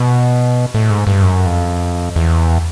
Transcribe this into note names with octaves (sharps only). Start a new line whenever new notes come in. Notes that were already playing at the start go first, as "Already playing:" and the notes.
Already playing: B2
A2
G#2
G2
F#2
F2
E2